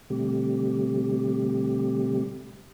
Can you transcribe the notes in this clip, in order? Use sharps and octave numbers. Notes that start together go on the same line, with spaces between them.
B2 D3 G3 A3 C4 G4